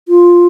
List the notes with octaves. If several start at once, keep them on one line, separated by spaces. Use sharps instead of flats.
F4